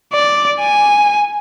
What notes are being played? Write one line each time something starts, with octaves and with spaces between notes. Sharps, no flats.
D5
G#5